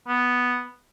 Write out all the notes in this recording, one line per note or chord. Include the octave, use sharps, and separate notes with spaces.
B3